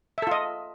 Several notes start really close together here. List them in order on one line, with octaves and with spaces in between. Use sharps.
E5 A4 F4 D#5